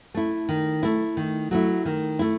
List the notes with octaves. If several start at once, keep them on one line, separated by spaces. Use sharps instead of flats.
A3 E4
D#3
A3 E4
D#3
F#3 A3 E4
D#3
A3 E4